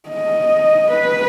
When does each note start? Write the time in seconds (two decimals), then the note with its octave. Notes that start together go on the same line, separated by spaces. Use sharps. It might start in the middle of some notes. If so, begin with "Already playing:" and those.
0.09 D#5
0.91 B4